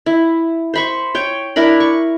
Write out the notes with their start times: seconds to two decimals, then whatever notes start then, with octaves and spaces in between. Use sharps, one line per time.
0.06 E4
0.74 C5 B5 C#6
1.15 C#5 G5
1.56 D4 E4 A#4 B5
1.80 C#6